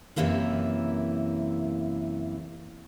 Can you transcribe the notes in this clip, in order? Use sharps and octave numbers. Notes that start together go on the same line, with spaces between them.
F#2 C3 E3 A#3 E4